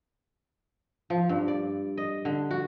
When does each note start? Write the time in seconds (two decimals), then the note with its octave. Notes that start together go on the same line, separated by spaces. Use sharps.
1.10 F3
1.29 G2
1.48 D5
1.98 D#5
2.25 D3
2.51 F#4